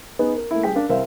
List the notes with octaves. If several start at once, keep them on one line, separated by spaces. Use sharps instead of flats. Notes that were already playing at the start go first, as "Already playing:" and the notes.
B3 D#4 G#4 B4
A#4
A3 A#3 E4
G3 G#4 G5 B6
D4 A#4 F5
C2 A#4 C5 E5 F5